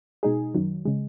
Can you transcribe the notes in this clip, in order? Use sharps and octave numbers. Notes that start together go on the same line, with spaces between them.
B2 G#3 D#4 G#4
F#2 D#3 F#3
C#3 G#3